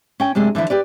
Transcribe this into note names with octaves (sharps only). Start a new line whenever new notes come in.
C#4 G5
F#2 C3 G#3 A3 D4
D3 E3 F3 E4
G4 B4 D5